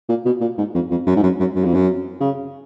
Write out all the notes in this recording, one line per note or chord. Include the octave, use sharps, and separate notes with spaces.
A#2
B2
A#2
G#2
F2
F2
F#2
G#2
F#2
F#2
F#2
F2
F#2
C#3